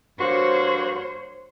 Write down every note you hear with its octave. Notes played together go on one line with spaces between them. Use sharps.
G2 A#3 F#4 C5 C#5